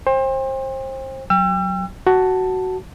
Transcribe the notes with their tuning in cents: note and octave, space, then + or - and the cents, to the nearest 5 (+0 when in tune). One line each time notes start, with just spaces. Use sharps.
C5 +30 G5 +35
F#3 +0 G5 +25 E6 +40
F#4 +10 A5 +5